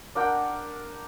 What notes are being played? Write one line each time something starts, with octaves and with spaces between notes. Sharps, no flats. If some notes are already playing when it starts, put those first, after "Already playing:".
D4 A#4 F#5 G5